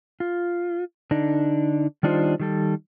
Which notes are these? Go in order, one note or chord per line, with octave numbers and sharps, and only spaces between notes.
F4
D3 D4 D#4
D#3 G3 D4 D#4 F4 C5
D#3 G3 A4